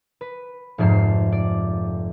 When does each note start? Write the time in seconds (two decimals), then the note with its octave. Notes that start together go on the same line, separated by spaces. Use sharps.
0.21 B4
0.78 F1 F2 G#2 C7
1.32 D5